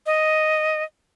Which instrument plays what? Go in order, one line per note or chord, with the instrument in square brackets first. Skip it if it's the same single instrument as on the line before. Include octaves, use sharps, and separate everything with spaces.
[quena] D#5